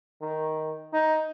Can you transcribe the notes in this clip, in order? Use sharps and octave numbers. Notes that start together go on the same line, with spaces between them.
D#3
D#4